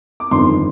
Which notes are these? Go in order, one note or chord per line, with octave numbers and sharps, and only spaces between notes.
D6
G1 F2 D#3 C6